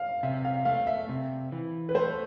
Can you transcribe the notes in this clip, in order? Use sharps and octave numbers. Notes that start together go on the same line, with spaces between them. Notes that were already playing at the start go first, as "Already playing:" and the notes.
Already playing: F5
C3 E5
F5
A3 F5
E5
C3
E3
B4
A3 C5